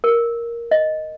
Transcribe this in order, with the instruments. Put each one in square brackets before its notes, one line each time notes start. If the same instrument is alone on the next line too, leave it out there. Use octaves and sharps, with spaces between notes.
[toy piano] A#4
D#5